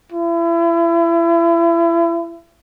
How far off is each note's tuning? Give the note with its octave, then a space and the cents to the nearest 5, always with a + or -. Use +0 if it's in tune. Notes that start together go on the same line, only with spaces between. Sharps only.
E4 +35